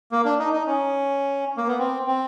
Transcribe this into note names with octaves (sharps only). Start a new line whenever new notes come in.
A#3
D4
D#4
D#4
C#4
A#3
B3
C4
C4